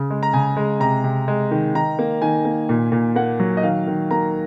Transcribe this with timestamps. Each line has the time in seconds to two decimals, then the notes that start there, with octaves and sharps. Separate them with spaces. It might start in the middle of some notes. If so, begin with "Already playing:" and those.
Already playing: C#3
0.10 G#3
0.23 A#5
0.33 C#3 G#5
0.57 G#3
0.80 C3 A#5
1.04 C3
1.28 G#3
1.51 D#3
1.75 D#3 A#5
1.99 A#3
2.22 D#3 G#5
2.45 A#3
2.69 A#2
2.92 A#2
3.16 A#3 F#5
3.39 F#3
3.57 D#5
3.63 D#3 F5
3.87 D#3
4.11 A#3 A#5